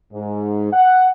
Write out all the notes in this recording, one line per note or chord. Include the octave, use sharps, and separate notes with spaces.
G#2
F#5